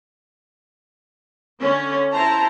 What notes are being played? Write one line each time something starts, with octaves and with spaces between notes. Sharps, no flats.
D3 C#4
E4 C5 A5 A#5